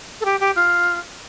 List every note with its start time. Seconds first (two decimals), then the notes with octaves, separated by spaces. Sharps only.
0.21 A4
0.25 G4
0.40 G4
0.56 F4